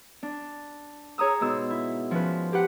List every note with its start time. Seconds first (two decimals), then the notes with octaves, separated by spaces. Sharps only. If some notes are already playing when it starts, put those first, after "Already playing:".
0.23 D4
1.18 G#4 C#5 A#5 D#6 E6
1.41 G#2 B2 E6
1.70 E4
2.11 F3 C#4 B4
2.53 G4 B4 F#5